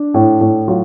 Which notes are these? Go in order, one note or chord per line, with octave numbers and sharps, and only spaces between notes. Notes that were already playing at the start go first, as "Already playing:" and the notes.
Already playing: D4
A2
A2
F#3 F4